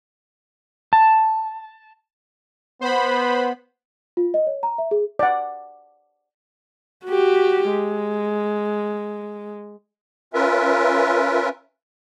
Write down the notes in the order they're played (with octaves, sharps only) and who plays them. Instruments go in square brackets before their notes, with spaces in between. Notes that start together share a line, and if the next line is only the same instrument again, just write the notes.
[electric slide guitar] A5
[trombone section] B3 [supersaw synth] C5 B5
[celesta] F4
D#5
C#5
A#5
E5
G#4
[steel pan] D5 F#5
[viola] F#4 G4
G#3
[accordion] C#4 F4 A#4 B4 E5